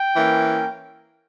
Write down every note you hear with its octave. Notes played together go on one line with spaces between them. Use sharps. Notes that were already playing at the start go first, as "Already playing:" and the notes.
Already playing: G5
E3 A#3 C#4